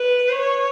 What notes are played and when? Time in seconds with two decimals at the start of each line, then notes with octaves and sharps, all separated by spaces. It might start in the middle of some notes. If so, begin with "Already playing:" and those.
Already playing: B4
0.30 C#5